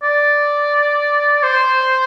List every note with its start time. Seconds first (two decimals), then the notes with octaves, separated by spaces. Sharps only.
0.03 D5
1.43 C5